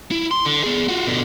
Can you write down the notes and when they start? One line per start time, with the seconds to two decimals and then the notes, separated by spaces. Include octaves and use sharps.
0.11 E4
0.31 C6
0.45 D3
0.64 B3 G#4
0.89 F4 F#4
1.07 B2 D3